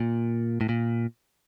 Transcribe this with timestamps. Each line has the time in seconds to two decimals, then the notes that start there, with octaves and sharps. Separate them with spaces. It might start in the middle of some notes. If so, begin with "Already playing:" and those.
Already playing: A#2
0.61 A2
0.69 A#2